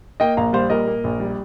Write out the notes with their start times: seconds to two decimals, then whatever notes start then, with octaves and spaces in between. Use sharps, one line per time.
0.20 A#3 D#5 G5
0.37 A#1 F5 A#5
0.53 G3 C5 F5
0.70 A#2 A#4 D#5
0.87 A#3
1.04 A#1
1.20 G3